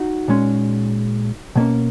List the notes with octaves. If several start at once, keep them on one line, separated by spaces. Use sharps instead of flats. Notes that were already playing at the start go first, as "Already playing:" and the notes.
Already playing: D#4 F#4
A#2 G#3 C#4
B2 A#3 C#4